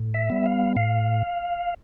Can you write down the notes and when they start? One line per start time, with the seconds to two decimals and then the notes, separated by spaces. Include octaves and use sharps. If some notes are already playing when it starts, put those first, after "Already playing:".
Already playing: A2
0.14 E5
0.30 G3 B3
0.46 F5
0.76 A2 F5